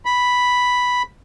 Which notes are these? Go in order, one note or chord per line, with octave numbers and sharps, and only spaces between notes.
B5